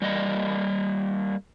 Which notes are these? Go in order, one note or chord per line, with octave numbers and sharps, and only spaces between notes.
G3 A#3 D#5